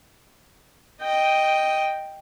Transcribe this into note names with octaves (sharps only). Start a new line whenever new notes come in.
D#5 G5